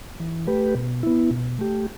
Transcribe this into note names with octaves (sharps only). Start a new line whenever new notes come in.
E3
A3 G4 B4
B2
B3 E4
B2
A3 G4